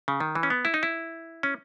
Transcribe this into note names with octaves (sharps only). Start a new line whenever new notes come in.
C#3
D#3
E3
C#4
B3
E4
D#4
E4
C#4